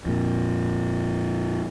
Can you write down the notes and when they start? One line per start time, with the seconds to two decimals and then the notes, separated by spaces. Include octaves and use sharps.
0.06 F2 A#2